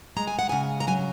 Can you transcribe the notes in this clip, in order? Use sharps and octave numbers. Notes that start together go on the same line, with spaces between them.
G#3 A#5
G#5
F#5
C#3 G#5
A#5
F#3 G#5